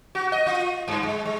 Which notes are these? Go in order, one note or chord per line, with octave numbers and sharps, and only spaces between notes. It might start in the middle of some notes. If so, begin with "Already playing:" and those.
F#4
D#5
F4
G2
G#3
G#3